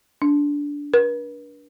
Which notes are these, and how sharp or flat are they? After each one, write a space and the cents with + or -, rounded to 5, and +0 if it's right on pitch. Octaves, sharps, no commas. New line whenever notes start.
D4 -15
B4 -45